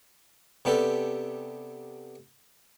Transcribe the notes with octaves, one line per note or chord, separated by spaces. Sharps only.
C3 B3 D4 G4 A4